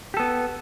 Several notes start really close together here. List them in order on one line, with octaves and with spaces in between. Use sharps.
G4 A4 B3